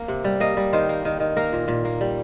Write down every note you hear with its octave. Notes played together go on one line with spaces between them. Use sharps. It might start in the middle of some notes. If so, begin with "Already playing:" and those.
Already playing: A#3
C3
G3
A#3 D#5
G3
D#3 C5
A#3
D#3
D#3
A#3 A#4
A#2
A#2
A#3
G3